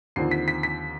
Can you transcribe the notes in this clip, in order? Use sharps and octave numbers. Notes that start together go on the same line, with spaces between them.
D#2 D3 F3 C4 D#4 C7
B6
B6
B6